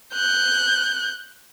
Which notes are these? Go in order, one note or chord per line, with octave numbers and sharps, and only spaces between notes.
F#6 G6